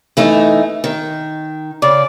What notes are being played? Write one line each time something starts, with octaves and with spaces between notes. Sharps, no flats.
E3 A3 D#4
D#3
C#3 D5